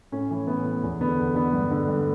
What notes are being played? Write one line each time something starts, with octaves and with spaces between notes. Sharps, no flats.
A2 C#4
E3
A2 B3
E3 B3
E2
D3 B3
E2
D3 B3
G2
D3
G2